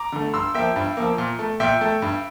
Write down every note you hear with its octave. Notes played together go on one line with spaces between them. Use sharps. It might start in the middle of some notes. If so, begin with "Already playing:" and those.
Already playing: A#5 D6
D3 A3
G2 C6 E6
F3 A#3 E5 G5
G2
F3 A#3
A#2
A3
A#2 E5 G5
A3
G2